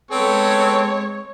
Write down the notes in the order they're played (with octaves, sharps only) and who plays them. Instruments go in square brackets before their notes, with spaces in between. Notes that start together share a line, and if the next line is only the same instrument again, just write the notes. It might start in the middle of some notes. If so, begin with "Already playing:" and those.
[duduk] G#3 [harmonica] B3 A4 [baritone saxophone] C4 [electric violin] C#5